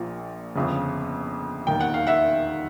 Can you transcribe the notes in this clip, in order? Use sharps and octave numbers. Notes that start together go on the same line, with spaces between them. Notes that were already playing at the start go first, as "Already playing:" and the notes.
Already playing: A#1 A#2 F3
G1 F2 C#3
E1 D#2 D#3 G5
F#5
F5
E5 F#5